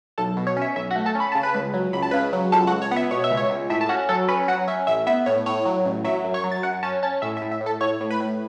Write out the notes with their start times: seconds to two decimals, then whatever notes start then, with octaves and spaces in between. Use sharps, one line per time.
0.18 B1 A4 A5
0.37 B2
0.47 C#5
0.57 C#4 E5
0.76 B1 E5
0.91 F#4 F#5
0.96 A3
1.06 A4 A5
1.15 C#4 B5
1.32 C#3 A5
1.43 B4 B5
1.55 C#2
1.74 F#3
1.93 C#2 B5
2.03 A5
2.11 C#3 B4 B5
2.33 F#3
2.52 C#2 A4 A5
2.67 F#4 F#5
2.72 C#2
2.82 C#5
2.91 B3 F#5
2.96 E5
3.11 B2 C#5
3.24 E5
3.31 C#2
3.37 C#5
3.50 C#2
3.70 A2 E5
3.81 A5
3.89 C#4 F#4 F#5
4.09 F#3 A4 A5
4.28 C#4 B4 B5
4.48 F#3 F#4 F#5
4.68 C#4 E5
4.87 A1 E5
5.07 B3 E5
5.26 A2 C#5
5.46 A2 C#5
5.65 F#3
5.85 A1
6.04 F#3 E5
6.24 F#2
6.34 C#5 C#6
6.44 F#3
6.52 A6
6.63 F#2 F#5 F#6
6.83 C#4 A5 A6
7.02 C#4 A5 A6
7.22 A2 E5 E6
7.37 E5
7.42 A2
7.52 E5
7.61 A2
7.66 A4 A5
7.81 A2 C#5 C#6
8.01 A2
8.10 B4 B5
8.20 A2